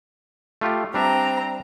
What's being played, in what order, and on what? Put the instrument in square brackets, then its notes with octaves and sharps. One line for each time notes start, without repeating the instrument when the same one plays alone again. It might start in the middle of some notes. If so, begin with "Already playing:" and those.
[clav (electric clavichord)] A3 F4 G4
[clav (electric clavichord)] G3 D4 E5 [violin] C4 A#5